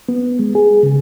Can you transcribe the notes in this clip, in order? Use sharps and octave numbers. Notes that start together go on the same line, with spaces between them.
B3
G#3
G#4
C#3